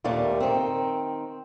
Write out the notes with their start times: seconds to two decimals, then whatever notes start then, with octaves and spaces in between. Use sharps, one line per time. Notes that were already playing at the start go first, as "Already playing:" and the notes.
0.04 D#2 A#2 G3 A3
0.40 D#3 C4